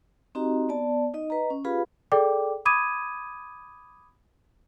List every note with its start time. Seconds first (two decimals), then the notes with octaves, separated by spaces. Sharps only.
0.35 C4 D#4 F#4 G4 D#5 A#5
0.69 B3 D5 A5
1.14 D#4 D#5
1.30 B4 D#5 A#5
1.50 C#4
1.65 F4 G4 G#4 B4 F5 B5
2.12 G#4 A4 D5 G5 D6
2.65 B5 D6 D#6 G#6 D#7